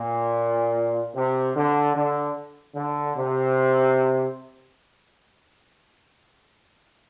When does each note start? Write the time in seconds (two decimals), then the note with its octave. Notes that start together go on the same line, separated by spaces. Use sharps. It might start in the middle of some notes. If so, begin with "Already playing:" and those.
Already playing: A#2
1.14 C3
1.55 D3
1.95 D3
2.75 D3
3.16 C3